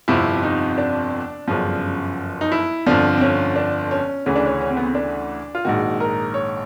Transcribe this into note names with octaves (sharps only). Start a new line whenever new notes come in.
G1 F2 C3 F3 E4
D#4
D4
G1 F#2 C#3 F3
D#4
E4
G1 F2 D3 F3 D4
C4
C#4
D4
C#4
D2 C#3 E3 C#4
D4
C#4
C#4
C4
B3
C4
D4
F4
A#1 G#2 D#3 F#4
A#4
C#5